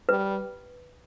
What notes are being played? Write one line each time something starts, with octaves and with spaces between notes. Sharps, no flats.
G3 B4